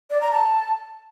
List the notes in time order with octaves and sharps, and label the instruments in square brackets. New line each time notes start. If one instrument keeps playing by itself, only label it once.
[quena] D5
A#5
A5